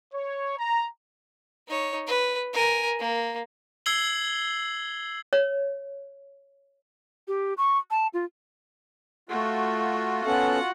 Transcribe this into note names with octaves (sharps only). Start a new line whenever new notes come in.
C#5
A#5
D#4 C#5
B4
A#4 G#5
A#3
E6 G#6 C7 F#7 G7
C#5
G4
C#6
A5
F4
A3 F4 F#4
B3 C#4 A4 F#5